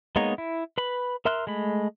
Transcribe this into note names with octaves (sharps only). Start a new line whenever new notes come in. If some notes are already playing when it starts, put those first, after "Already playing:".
G#3 A#3 B3 D#4 C#5
E4
B4 B5
A#4 E5 C6 F6 F#6
G#3 A3 B5